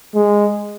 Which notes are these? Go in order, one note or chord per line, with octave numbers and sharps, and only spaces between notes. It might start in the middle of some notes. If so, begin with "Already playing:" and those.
G#3